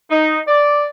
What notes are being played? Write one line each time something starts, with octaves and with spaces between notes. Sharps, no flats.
D#4
D5